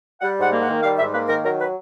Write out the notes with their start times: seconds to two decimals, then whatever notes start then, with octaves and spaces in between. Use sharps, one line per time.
0.21 G3 F#5
0.37 G#2
0.42 F#5
0.51 A#3
0.62 F#5
0.67 D#3
0.83 G3 F5
0.98 G#2 E5
1.13 A#3 B4
1.29 D#3 A#4
1.44 F#3 A#4
1.60 B4